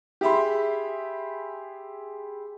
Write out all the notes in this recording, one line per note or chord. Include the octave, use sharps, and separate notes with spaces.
G4 G#4 E5 B5 C6